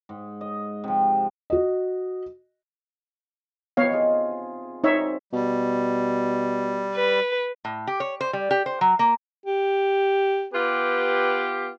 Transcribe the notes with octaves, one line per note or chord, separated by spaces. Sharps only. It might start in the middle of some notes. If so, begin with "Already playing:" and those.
G#2
D#5
C3 F3
F#4 D#5
C3 D#3 F3 B3 C#5 F5
D#4 F4 G#4
C4 D#4 F#4 C#5 D5 E5
B2 G3
B4
A2
G4
C#5
C5
G3
G4
C5
F#3
A#3
G4
B3 F4 G4 B4